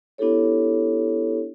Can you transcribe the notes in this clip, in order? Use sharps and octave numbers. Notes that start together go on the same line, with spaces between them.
B3 D4 E4 G4 A4 C#5